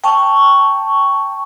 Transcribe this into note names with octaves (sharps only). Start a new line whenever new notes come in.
G5 A5 C#6